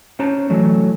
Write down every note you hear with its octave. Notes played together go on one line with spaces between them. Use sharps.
C#4 C5 A5 A#5
E3 F#3 A3